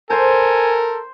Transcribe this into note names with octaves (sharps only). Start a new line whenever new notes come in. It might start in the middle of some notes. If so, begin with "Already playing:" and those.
A4 A#4 C5 G#5 C6